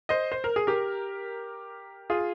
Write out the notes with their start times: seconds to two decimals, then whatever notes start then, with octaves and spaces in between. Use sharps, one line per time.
0.09 C5 D#5
0.32 C5
0.44 A#4
0.56 G#4
0.67 G4 A#4
2.10 F4 G#4